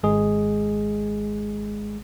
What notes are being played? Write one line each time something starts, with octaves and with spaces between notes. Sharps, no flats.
G#1 G#3 G#4